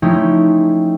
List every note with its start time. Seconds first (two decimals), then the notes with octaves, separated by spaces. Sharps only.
0.02 F3 A3 C#4 D#4 E4 G4